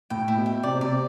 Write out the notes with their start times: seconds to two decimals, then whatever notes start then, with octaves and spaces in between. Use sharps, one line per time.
0.10 A2 G5
0.28 E4
0.37 B2
0.46 G5
0.63 C3 D5
0.81 C3 D5